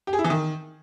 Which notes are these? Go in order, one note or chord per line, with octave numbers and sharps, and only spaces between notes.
G4
G#4
E4
E3
D#3